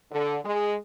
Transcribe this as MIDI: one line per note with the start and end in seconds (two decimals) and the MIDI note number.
0.12 0.37 50
0.44 0.75 56